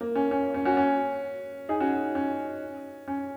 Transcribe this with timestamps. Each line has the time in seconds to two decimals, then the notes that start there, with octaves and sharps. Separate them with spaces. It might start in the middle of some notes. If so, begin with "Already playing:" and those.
0.01 A#3
0.15 C#4
0.31 C#4
0.54 C#4
0.65 C#4 F#4
0.77 C#4
1.69 D#4 G#4
1.80 C#4 F#4
2.15 C#4
3.08 C#4